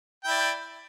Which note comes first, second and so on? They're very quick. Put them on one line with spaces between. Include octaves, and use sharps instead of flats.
G5 E4 D5